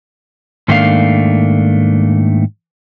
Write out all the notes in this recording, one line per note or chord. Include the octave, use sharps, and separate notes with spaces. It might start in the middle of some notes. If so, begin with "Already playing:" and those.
G#2 D#3 A3 A#3 D4 F5